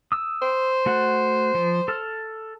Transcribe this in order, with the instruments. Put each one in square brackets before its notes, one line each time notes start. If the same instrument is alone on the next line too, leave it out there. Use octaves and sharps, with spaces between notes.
[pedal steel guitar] D#6 E6
[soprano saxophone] C5
[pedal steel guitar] A3 F#4 F#5
F3
A4 A5 F6